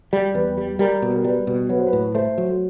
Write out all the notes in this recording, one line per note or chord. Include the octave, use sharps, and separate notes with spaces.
G3
E2 B4
G3
G3 A#4
B2
A#4
G3 B4
B2
F#3 B4
C5
B4
A2
A3 C5
F#3